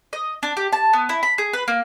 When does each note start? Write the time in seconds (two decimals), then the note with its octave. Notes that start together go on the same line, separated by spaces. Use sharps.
0.13 D#5
0.43 D4
0.57 G4
0.72 A5
0.93 B3
1.09 E4
1.23 B5
1.38 G#4
1.53 B4
1.68 A#3